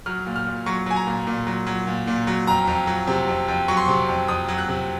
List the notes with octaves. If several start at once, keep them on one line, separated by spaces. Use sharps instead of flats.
F#3 F6
A#2
F6
A#2
F#3 C#6
F#3 G#5
A#5
A#2
A#2
F#3
F#3
A#2
A#2
F#3
F2 A#5
F2
F#3
C3
F2
F2
F#3 C#6
C6
C3 C#6
F2
F2 D#6
F#3
F#6
C3